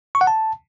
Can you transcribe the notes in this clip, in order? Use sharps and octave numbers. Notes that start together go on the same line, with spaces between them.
C#6
F#5
A5